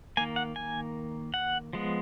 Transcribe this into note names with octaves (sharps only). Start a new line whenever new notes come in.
D#3 A#3 G#5
F#5
G#5
F#5
F3 G#3 B3